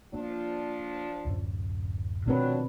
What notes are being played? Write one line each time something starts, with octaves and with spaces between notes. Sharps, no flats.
F3 A#3 D4
D1 F#2 C#4
B2 D#3 F3 F#3 A3 C4 D4 B4